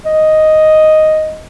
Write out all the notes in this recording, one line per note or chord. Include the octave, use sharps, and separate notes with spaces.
D#5